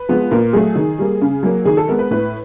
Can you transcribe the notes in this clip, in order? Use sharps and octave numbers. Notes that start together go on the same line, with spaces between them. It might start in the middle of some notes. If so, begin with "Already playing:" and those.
Already playing: B4
F3 G#3 B3
A#2 A#4
F#3 A3 G#4
D#3
G3 A#3
C#3
F#3 A#3
D#3 G#4
A4
G#3 B3 A#4
B4
A2 B4